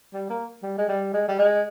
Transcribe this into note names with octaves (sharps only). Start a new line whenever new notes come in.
G3
A#3
G3
G#3
G3
G#3
G3
G#3